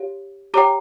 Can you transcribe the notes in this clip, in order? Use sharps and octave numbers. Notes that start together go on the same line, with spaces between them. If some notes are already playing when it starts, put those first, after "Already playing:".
Already playing: G4 C#5 F5
G4 C#5 G5 A#5 D6